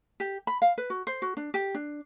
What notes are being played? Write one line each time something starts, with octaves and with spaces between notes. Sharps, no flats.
G4
B5
F5
B4
F#4
C5
F#4
D4
G4
D4